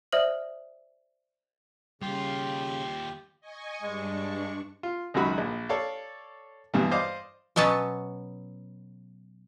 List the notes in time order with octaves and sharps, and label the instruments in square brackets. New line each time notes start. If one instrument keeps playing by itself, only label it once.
[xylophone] C5 D5 E5 D#6 F6 F#7
[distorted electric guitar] D#2 F4 [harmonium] C#3 [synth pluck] G3 [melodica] G4
[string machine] D#5 G#5 C#6
[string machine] G2 D4 C#6 [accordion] G#3
[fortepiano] F4
C#2 F#2 D#3 F#4 B5
A#1
A4 C#5 D5 F5
G2 B2 E3
C5 D5 D#5 F5 D6
[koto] B2 F#3 B3 C#4 A5